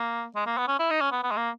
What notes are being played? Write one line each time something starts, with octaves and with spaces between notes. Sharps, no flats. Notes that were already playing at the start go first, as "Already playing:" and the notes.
Already playing: A#3
G#3
A#3
B3
C#4
E4
D#4
C#4
B3
B3
G#3
A#3